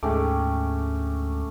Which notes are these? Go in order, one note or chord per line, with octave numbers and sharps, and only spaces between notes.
D2 G#2 G#3 A3 C#4 G5 D6